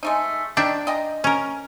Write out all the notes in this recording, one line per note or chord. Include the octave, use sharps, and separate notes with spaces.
G#3 A3 D#4
D#3 D4 E5 G5
D#5 G5 A#5
C#4 A#4